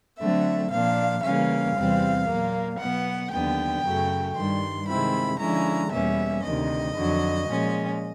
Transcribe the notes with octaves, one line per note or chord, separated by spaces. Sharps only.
D3 F#3 A3 C4 E5
A#2 F3 A#3 D4 F5
C#3 E3 G3 A#3 C#4 F5
E2 C3 E3 G3 C4
A#2 F#3 A#3
B2 F#3 B3 F#5
D#2 D3 F#3 B3 G5
F#2 C#3 F#3 A3
G2 D#3 G3 C6
C3 D#3 G#3 C4 E4 B5
D3 F3 G#3 C#4 E4 A#5
E2 B2 G3 A#3 C#4 E5
D2 C3 D#3 D#5
F2 D3 F#3
A#2 F3 G#3 C#4